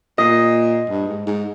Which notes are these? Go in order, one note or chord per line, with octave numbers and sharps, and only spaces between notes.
A#2 D#5
G2
G#2
G#2